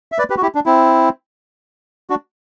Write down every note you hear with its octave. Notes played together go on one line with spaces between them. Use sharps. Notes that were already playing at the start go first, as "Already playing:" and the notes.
E5
B4 D5
G4 B4
F#4
E4 G4
D4
C4 E4
D4 F#4